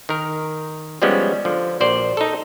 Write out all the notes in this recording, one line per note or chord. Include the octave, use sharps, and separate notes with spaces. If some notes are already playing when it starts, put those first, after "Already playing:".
D#3 A#4
F3 G3 G#3 B3 C#4
D3 F3
A#1 F#4 C5 D5
D#4 A4